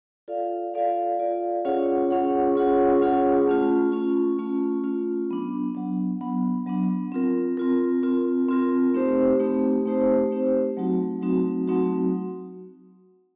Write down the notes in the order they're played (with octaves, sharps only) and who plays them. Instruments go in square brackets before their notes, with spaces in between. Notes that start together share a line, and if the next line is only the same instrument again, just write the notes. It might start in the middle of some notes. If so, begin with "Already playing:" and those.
[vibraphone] F4 A4 D5 F5
F4 A4 D5 F5
F4 A4 D5 F5
C#4 F4 G#4 C#5 F#5
C#4 F4 G#4 C#5 F#5
C#4 F4 G#4 C#5 F#5
C#4 F4 G#4 C#5 F#5
A3 C#4 F4
A3 C#4 F4
A3 C#4 F4
A3 C#4 F4
F#3 B3 D4
F#3 B3 D4
F#3 B3 D4
F#3 B3 D4
C4 F4 A#4
C4 F4 A#4
C4 F4 A#4
C4 F4 A#4
A3 C4 D#4 G4 C5
A3 C4 D#4 G4 C5
A3 C4 D#4 G4 C5
A3 C4 D#4 G4 C5
F#3 A3 C4 D#4 F#4
F#3 A3 C4 D#4 F#4
F#3 A3 C4 D#4 F#4